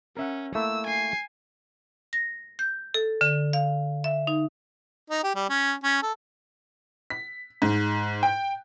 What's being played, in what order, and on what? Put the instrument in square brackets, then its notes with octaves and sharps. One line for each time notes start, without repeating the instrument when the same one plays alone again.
[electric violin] C#4 [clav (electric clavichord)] A#4 E5 F#5
[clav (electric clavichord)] A3 A#3 E4 [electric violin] E6
[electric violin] G#5 C7
[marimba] A#6
G6
A4
D3
F5
E5
D#4
[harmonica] D#4
G4
G3
C#4
C#4
A4
[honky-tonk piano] B6
G#2
G5